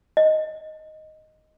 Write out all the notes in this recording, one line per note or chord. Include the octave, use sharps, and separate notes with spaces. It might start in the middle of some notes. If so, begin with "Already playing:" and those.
D#5